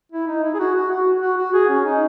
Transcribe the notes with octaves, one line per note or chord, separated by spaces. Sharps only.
E4
D#4
E4
G#4
F#4
F#4
F#4
F#4
F#4
G#4
C#4
D#4